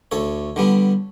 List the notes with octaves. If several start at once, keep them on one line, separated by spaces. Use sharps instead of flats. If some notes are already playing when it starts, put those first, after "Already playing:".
D2 A4 C#5
D3 G3 B3